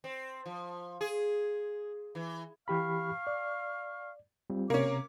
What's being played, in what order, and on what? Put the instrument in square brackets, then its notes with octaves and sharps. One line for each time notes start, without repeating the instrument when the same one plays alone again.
[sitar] C4
F3
G#4
E3
[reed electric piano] E3 G4 B5 [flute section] F5 C#6 F6
[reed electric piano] D5
G3 C4 F4
[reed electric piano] C3 [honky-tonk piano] A#3 C#4 [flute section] D6